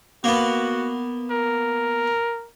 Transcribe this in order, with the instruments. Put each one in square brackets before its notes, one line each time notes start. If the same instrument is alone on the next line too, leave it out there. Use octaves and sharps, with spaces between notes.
[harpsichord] A#3 B3 [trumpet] F#4
[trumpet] A#4